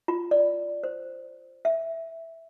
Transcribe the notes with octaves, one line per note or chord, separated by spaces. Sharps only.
F4
D5
C5
E5